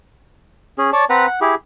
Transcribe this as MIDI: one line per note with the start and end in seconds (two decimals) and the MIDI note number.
0.78 0.90 61
0.78 0.90 68
0.93 1.05 73
0.93 1.05 74
0.93 1.05 81
1.10 1.26 60
1.10 1.26 71
1.10 1.26 78
1.10 1.26 82
1.27 1.40 78
1.41 1.55 64
1.41 1.55 67
1.41 1.55 68